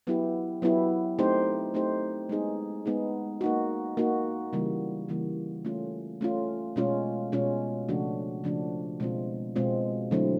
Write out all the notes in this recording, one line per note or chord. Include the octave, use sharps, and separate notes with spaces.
F#3 B3 E4 G4
F#3 B3 E4 G4
A3 C4 D#4 G4 C5
A3 C4 D#4 G4 C5
G#3 B3 D#4 G#4
G#3 B3 D#4 G#4
A#3 D#4 F#4
A#3 D#4 F#4
C#3 E3 G3 A#3
C#3 E3 G3 A#3
A3 C#4 F4
A3 C#4 F4
B2 G#3 C#4 F4
B2 G#3 C#4 F4
C#3 F3 A3 D4 F#4
C#3 F3 A3 D4 F#4
B2 G#3 C4 F4
B2 G#3 C4 F4
D3 F#3 A3 C4 E4